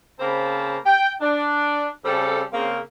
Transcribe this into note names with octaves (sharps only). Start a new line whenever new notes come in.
C#3 A#3 C4 C5 A5 B5
G5
D4
C#3 G3 C4 A4
C#3 A#3 C4